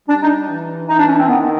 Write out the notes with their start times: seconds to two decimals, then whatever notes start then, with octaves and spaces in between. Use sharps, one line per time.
0.08 G3 D4
0.22 D#4
0.49 E3
0.89 E3 D#4
0.99 D4
1.08 C#4
1.19 C4
1.28 D#3 B3